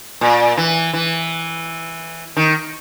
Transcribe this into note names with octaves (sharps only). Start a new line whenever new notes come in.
A#2
E3
E3
D#3